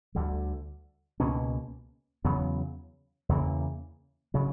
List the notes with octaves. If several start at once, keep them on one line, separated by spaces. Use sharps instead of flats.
D2 D3 G3
C#2 B2 A#3 C#4
E2 C#3 F#3 B3
E2 C#3 E3 A#3
C#3 F#3